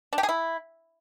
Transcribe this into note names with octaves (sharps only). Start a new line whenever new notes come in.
D4
G4
G#4
E4